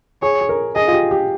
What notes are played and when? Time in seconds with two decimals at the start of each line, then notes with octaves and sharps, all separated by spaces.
0.22 G#4 C#5
0.41 G#4
0.49 A#4
0.76 G#4 D#5
0.87 F4
0.93 G4
1.11 G4